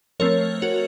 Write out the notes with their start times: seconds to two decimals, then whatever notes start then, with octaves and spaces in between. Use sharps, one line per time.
0.20 F3 A3 C4 A#4 C#5
0.62 F#4 A#4